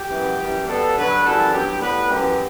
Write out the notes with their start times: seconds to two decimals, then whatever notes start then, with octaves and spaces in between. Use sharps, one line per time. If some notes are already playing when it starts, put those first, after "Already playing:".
Already playing: G4
0.10 F#2 E3 B3
0.39 F#2 E3 G3
0.67 B2 G3 B3 A4
0.96 G2 D3 F#3 B4
1.24 F#2 E3 G3 B3 A4
1.52 G2 F#3 B3 G4
1.80 A2 G3 B3 B4
2.09 F#2 E3 B3 G4